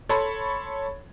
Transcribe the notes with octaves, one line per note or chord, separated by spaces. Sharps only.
A4 C#5 A5 B5 C6